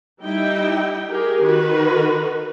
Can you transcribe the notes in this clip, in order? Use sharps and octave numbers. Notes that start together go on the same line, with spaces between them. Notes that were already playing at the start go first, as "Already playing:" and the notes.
G3 D#4 E4 G5
G4 G#4 A#4
D#3 F#4 B4